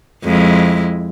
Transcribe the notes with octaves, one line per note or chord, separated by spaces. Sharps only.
F2 G#3 E4